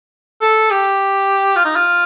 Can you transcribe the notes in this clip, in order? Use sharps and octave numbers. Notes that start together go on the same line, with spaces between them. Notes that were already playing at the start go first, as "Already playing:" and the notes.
A4
G4
F4
D#4
F4